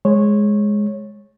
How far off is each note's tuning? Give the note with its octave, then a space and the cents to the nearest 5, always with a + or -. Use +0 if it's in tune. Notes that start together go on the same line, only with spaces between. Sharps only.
G#3 +0 C#5 -15